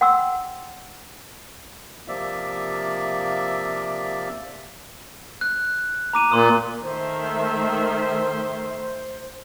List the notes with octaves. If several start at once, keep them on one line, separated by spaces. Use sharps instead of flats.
F#5 G5 C6 D6 E6
C3 F3 A#3 D5 E5
F#6
A#5 D6 D#7
A#2 C6 D#6
D#3 A3 C5 E5